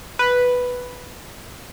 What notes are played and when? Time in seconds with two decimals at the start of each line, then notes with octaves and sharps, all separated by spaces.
0.19 B4